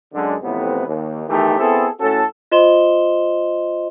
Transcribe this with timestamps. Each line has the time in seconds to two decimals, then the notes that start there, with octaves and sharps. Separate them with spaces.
0.13 F#2 D3 G#3
0.42 A1 F2 A2 C3 B3 B4
0.87 D#2
1.29 E2 D#3 E3 A3 D#4 G4
1.59 B3 C4 E4 G#4 A4
2.00 A2 C#4 F#4 A4
2.52 F4 C5 D#5 C6 E7 G7